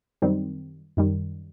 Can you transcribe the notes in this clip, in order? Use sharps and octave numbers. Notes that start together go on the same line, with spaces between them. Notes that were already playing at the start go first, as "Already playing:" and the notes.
F#2 D#3 G3 C4
F#2 D#3 G3